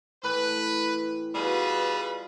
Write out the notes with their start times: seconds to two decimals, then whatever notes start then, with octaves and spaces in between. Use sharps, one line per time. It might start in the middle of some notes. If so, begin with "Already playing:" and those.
0.23 A2 E3 B4
1.35 B2 G3 F4 G#4 B4